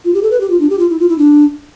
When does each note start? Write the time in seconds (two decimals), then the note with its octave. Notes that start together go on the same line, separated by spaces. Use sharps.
0.05 F4
0.14 G4
0.23 A4
0.31 B4
0.40 G4
0.50 F4
0.60 D4
0.70 G4
0.79 F4
0.90 E4
1.00 F4
1.09 E4
1.18 D4